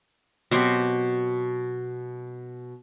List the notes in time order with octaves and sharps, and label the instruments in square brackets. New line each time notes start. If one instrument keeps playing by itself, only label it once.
[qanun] B2 F#3 C4 G4